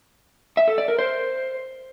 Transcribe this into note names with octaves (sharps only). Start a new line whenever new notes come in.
E5
A4
D5
A#4
C5